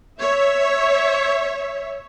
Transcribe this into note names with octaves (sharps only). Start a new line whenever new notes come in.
C#5 E5